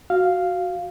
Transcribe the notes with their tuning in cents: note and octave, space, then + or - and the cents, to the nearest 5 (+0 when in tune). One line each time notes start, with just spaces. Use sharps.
F#4 +0 F5 -5